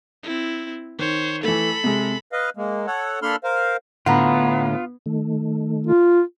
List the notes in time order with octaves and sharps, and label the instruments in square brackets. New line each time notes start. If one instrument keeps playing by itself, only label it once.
[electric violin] C4 E4
[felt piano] D#3 [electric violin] C5 C#5
[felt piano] E3 A3 [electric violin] A4 B5
[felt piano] C3 G#3
[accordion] B4 D#5 F5
G#3 A#3
A4 C#5 F#5
A#3 D4 A4 B5 C6 F6
A#4 C5 F5
[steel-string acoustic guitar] A2 D3 [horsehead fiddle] B3 [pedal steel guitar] F4 [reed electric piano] F#5 A#5 B5
[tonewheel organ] D#3 A3
[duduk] F4